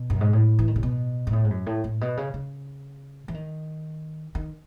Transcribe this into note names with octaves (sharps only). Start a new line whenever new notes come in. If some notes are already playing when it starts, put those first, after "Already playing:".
Already playing: B2
F#2
G#2
A2
E3
D#3
C#3
B2
G#2
A2
G#2
F#2
A2
A2
B2
C#3
C#3
E3
D#3
D#3